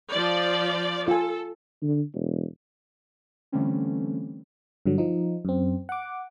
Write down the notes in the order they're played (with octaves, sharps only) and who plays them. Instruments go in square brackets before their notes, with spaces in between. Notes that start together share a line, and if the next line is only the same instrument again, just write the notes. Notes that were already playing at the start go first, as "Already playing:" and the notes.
[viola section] F3 D5
[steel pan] F4 G#5 [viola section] A4
[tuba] D3
E1
[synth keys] D3 E3 G3 A3 C4 C#4
[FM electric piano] G2 D3 F#3
F3 D#4
F#2 C4
F#5 D6